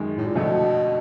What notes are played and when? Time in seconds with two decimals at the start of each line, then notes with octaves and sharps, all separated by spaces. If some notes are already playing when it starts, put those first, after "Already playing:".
Already playing: F#2 D#3 G#3
0.17 A2
0.27 A#2
0.35 F2 B2 D3 F#3 A3